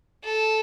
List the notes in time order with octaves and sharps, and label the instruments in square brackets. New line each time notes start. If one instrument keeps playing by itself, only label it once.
[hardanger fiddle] A4